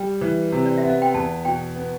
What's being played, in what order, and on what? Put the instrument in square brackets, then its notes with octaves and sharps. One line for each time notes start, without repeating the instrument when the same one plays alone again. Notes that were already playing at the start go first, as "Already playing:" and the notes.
Already playing: [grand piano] G3 [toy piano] G5
[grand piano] E3
C3
[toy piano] D5
E5
[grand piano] B3
[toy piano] F5
G5
[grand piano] E2 [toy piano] A5
[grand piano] B2 [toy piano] G5
[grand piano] B3